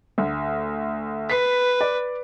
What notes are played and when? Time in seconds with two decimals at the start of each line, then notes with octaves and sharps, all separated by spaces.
0.18 D2
1.30 B4 B6 C7
1.81 D5